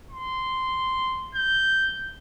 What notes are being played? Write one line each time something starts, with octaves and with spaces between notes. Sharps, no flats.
C6
G6